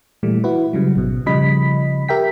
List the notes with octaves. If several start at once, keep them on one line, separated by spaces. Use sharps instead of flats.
A#2 E3 G3 A3
E4 F#4 B4
C#3 F#3 G3
G#1 B2
C#3 F3 G3 D#5 B5 B6
G4 A#4 E5 G5 B6